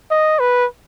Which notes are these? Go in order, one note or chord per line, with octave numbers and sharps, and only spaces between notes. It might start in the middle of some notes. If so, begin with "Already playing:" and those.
D#5
B4